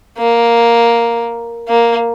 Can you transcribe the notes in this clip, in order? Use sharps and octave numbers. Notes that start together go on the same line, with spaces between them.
A#3
A#3